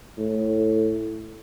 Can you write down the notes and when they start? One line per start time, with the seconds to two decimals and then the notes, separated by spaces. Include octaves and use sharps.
0.18 A2